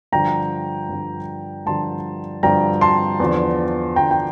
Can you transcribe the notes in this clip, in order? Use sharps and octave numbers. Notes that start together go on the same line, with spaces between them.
G2 D3 F3 G5 A#5
G2 D3 F3
G2 D3 F3 A5 C6
G2 D3 F3 G5 A#5
A5 C6
E2 D3 F3
E2 D3 F3 G5 A#5
G5